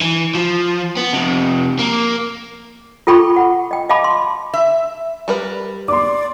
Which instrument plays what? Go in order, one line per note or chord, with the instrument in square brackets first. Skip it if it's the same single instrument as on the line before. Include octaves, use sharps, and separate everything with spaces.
[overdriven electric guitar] E3
F3
B3
F2 C3
A#3
[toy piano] F4 A4 G5 B5 C#6 D6
F#5
D#5 G5
D#5 F5 G5 A5 B5 D6
C6
[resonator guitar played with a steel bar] E5
[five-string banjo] G3 A#4 B4
[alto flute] D5 [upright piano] C6 D6